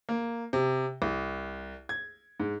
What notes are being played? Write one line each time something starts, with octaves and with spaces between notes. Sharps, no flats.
A#3
C3
C2
G#6
G#2